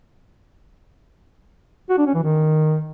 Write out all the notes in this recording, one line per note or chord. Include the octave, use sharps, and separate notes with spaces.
F#4
D4
C#4
E3
D#3